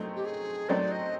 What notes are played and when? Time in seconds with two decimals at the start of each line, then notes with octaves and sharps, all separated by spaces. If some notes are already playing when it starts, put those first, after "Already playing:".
Already playing: F#3 A3 C4 D#4
0.16 G4
0.25 G#4
0.69 F#3 A3 C4 D#4 D5
0.91 D#5